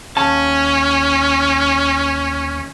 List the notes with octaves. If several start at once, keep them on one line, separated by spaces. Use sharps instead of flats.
D#2 C#4 A5